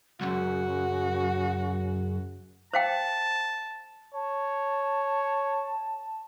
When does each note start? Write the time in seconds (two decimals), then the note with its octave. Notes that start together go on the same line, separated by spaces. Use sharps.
0.21 B1 F#2 C#3 F#4
2.73 C5 F5 G5 A5
4.14 C#5 A5